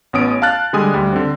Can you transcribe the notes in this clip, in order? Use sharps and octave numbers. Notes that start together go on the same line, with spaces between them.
A1 B3 C#4 D#6 D7
F5 A5 F6 F#6 A6
D3 G3 G#3 G#5 D#6
D2 G3
D3 C4